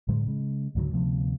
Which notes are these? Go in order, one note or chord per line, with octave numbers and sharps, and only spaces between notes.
A2 D3 F#3 G#3
C#3 G#3
C#2 G#2 D3 F#3
D2 C3 F3 B3